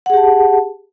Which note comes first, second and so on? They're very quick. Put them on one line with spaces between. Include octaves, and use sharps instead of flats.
F#5 G#4 G4 A5